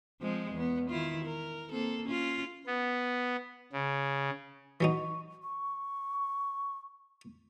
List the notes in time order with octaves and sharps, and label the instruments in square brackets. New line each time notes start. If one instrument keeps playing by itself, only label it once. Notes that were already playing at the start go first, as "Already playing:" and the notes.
[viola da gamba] F3 G#3 C4
E2 B3
D#3 E4 F4
A#4
A#3 C4 A4
C#4 F4
[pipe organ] B3
C#3
[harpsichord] E3 F#3 D#4 [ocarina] C#6
[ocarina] C#6